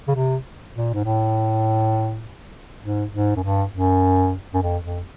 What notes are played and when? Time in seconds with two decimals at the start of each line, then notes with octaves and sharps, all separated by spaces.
0.08 C#3
0.15 C3
0.75 A#2
0.94 G#2
1.04 A2
2.83 G#2
3.14 G#2
3.36 F#2
3.43 G2
3.73 F#2
4.54 F#2
4.62 F2
4.85 F2